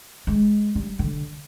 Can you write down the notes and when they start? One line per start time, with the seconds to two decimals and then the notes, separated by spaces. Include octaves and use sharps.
0.27 G#3
0.75 G3
0.99 D3